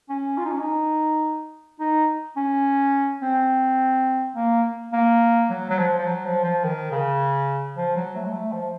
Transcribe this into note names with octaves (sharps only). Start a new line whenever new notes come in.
C#4
F4
D#4
C#4
D#4
D#4
C#4
C4
A#3
A#3
F#3
F#3
F3
F3
F#3
F3
F3
D#3
C#3
F3
F#3
A3
F#3
A3
F3